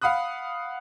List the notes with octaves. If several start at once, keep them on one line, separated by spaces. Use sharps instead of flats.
F5 F#5 B5 D#6 F#6